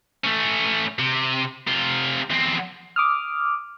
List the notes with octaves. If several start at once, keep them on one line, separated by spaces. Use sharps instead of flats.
A3 C#4
C3
C3 F4
E2 C4
D6 D#6 F6